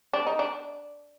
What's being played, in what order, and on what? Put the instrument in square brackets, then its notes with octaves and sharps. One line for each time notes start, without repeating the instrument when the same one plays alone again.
[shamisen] D4
D#4
D4